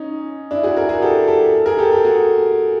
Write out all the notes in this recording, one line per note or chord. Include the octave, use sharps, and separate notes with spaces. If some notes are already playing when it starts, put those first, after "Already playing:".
Already playing: C#4 D#4
D4 E4
F#4 G#4
G#4 A#4
F#4 G#4
G4 A4
G4 A4
G#4 A#4
G4 A4
G4 A4
F#4 G#4